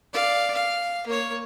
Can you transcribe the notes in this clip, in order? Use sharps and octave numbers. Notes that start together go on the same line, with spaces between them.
D5 F5
F5
A#3 C#5